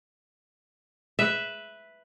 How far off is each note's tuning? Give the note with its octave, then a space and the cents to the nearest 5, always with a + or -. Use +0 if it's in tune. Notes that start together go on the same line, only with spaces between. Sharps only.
B4 +0 E5 +0